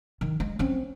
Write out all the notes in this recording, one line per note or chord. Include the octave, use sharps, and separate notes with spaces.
D#3
G#3
C4 C#4